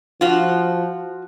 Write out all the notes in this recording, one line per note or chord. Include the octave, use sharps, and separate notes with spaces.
F3 F4 F#4